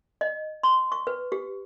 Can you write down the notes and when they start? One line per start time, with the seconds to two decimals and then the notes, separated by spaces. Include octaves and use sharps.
0.21 D#5
0.63 C6
0.92 C#6
1.07 B4
1.32 G4